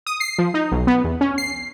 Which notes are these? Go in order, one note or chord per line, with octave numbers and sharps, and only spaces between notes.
D#6
C7
F3
D#4
B1
B3
E2
C#4
C7